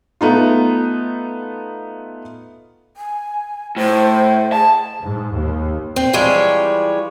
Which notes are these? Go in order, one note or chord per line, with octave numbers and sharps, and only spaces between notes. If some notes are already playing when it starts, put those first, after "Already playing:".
A3 B3 D#4 F4
G#5
A2 C5
G#4 A5
G#2
D#2
C4
E3 F3 G3 G#3 C#5